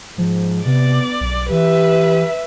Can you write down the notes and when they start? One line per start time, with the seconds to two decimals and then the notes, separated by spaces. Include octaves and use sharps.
0.18 G#2 F3
0.66 C3 B3 D5
1.21 B1
1.50 E3 G4 B4 E5